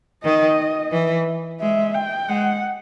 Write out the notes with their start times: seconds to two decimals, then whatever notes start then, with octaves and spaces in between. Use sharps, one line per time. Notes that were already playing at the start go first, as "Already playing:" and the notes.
0.24 D#3 D#5
0.92 E3
1.60 G#3 E5
1.94 G5
2.28 G#3 F#5